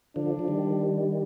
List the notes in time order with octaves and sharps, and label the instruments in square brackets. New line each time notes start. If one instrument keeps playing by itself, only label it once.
[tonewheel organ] D3 F3 [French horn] D4
[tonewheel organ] F3
D#3 G3